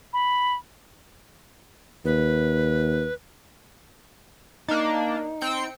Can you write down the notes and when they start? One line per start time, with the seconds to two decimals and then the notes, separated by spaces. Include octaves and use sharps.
0.13 B5
2.05 D#2 B4
4.68 A#3 D4 D#4
5.41 C4 G5 C#7